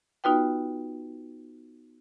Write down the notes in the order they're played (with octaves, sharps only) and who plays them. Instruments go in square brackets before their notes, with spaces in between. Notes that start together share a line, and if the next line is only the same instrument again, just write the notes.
[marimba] B3 D#4 F4 F#4 B4 G5